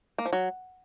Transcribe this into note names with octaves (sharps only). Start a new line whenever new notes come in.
A#3
F3
F#3